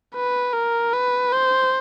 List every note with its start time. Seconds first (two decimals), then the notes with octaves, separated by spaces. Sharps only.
0.16 B4
0.54 A#4
0.93 B4
1.33 C5